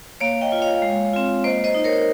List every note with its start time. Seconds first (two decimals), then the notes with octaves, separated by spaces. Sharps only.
0.20 A#3 C#5 F5
0.41 D#5 G5
0.52 F4
0.62 C#5 F5
0.82 G#3
1.13 C4 F4
1.44 A#3 C5 D#5
1.64 C5 D#5
1.75 D#4
1.84 A#4 C#5